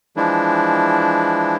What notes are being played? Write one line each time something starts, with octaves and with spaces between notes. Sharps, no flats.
E3 F3 G#3 D4 E4